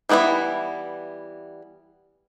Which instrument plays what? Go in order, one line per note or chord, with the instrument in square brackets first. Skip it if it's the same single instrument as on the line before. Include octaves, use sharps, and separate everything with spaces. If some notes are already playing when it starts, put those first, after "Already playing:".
[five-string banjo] E3 G3 B3 D#4 E4